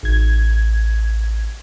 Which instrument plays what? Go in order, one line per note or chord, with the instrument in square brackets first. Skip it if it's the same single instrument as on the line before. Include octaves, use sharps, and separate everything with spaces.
[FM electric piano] A1 G#6